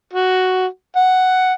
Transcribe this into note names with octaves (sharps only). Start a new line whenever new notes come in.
F#4
F#5